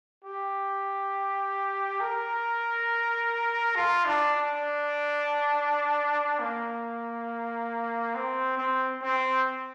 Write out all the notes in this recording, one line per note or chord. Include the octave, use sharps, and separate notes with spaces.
G4
A#4
F4
D4
D4
A#3
C4
C4
C4